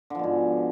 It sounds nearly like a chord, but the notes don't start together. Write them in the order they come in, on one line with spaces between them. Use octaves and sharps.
D3 F3 B2 G#2